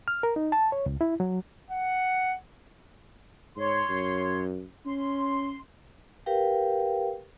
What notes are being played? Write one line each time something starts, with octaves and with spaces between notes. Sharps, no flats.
F6
A#4
D#4
A5
C#5
C#2
E4
F#3
F#5
G#2 C#5 C6
F#2
C#4 C6
G4 A#4 B4 F5 G5